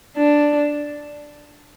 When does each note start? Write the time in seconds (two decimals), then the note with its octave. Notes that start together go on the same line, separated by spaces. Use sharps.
0.16 D4